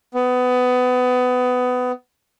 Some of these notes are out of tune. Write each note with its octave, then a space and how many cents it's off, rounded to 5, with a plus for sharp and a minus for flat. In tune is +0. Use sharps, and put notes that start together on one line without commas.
B3 +20